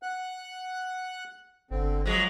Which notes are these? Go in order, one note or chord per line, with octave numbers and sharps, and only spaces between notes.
F#5 F#6
G1 D3 C4
F3 F#3 G#3